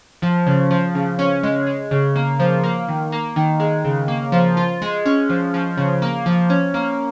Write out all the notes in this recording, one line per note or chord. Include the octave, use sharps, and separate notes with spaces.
F3
C#3
F3
C#3
C#4
G#3
G#3
C#3
A#3
F3
A#3
D#3
A#3
D#3
G#3
C#3
A#3
F3
F4
G#3
C#4
F3
F3
C#3
A#3
F3
C#4
A#3